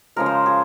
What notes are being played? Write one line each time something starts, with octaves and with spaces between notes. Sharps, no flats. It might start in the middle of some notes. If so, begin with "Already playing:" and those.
C#3 F3 G#3 A#4
C5
G#4